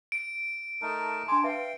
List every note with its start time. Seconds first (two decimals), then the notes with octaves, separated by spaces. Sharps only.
0.12 D7
0.82 A3 D#4 A#4 A5
1.28 D4 G#5 C6 D6
1.44 B4 E5 F5 G5